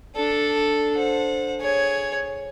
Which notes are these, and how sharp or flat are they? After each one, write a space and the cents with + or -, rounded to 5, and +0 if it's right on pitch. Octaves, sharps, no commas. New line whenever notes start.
D4 +0 A4 +0
C5 +0 F#5 -30
G#4 +0 C#5 +5